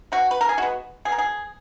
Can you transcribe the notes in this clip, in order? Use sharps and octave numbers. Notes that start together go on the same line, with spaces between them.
B2 F#4
B4
A#4
G#4
G#3 B3 F#4
B2 G#4
A#4
G#4